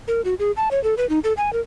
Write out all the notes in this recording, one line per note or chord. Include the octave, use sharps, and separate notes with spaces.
A#4
F#4
G#4
A5
C#5
A4
B4
D#4
A4
G#5
A#4